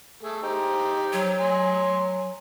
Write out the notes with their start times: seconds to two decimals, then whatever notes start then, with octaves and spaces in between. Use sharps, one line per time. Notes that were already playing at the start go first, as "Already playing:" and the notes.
0.23 A3 G#4 A4
0.43 D#4 G4 C5
1.13 F#3
1.40 G#5 C6